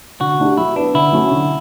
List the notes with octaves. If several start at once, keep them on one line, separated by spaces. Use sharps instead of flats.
D3 F#4
A3 D4 G4
F#3 E4
B3 D4 E4 B4
D3 E4
F#3 A3 C#4
D3